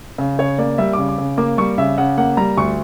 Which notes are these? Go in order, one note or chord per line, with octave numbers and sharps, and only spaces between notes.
C#3
C#3 C#5
A#3 D5
G3 E5
C#3 D6
D6
C#3
A#3 D6
G3 C#6
C#3 E5
C#3 F#5
A#3 F#5
G3 A#5
D2 C#6